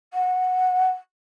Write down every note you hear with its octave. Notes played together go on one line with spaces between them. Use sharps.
F#5